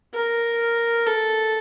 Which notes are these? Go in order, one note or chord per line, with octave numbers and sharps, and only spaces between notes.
A#4
A4